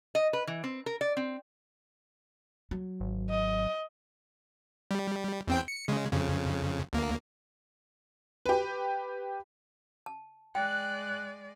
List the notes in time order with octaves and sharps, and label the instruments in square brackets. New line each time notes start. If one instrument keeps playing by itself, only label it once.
[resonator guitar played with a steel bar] D#5
B4
E3
C4
A#4
D5
C4
[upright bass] F#3
[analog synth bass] G#1
[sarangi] D#5
[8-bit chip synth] G3
E2 C4 G5
C#7
C#3 G#3
F2 C#3
D2 A#3
[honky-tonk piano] G4 B4
[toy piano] A5
[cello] G#3 D5 [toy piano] G5 [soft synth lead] F#6